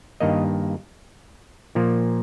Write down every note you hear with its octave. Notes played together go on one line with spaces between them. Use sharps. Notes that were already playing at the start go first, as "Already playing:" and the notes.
G2 D#3 A#3 D#5
A#2 F3 A#3